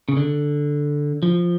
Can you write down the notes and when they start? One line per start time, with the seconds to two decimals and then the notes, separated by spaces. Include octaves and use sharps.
0.09 C#3
0.17 D3
1.23 F3